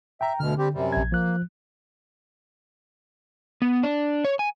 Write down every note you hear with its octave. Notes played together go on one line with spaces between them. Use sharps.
E5 G5 A#5
D2 B2 D3 F6
G3 C4 G4
F#2 C3 G3
A#1 G#6
F3 A#3 F#6
B3
D4
C#5
G#5